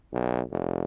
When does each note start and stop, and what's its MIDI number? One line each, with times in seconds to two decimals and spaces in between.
0.13 0.42 35
0.51 0.85 29